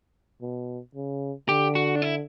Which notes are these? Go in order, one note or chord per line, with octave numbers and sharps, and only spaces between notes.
B2
C#3
D3 G4
F#4
D4
E4